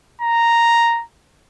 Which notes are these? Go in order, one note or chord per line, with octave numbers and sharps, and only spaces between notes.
A#5